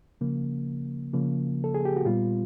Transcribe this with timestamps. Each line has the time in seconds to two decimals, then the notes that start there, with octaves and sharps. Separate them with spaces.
0.21 C#3 F3 A#3
1.13 C#3 F3 A#3
1.64 A4
1.75 G#4
1.85 G4
1.96 F#4
2.06 A#2 G3 B3 F4